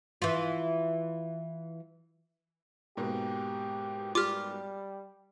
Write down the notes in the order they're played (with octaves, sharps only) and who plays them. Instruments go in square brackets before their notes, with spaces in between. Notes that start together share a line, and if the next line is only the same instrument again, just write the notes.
[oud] E3 F4
[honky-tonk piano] G#2 B2 A#3 [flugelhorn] G4
[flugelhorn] G3 [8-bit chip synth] F4 G4 [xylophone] D6 F6